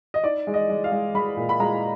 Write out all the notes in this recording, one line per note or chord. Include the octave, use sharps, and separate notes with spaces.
D#5
D#4 D5
G#3
D#5
G#3
F5
G#3
G#3 B5
A#2
B5
G#3 A#5